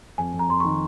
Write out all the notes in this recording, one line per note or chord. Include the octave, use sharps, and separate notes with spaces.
F2 G#5
F2
A#5
F2 C6
C#6
D#3